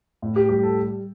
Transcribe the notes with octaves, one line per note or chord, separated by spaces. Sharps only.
A2
G4
G3 G4
A4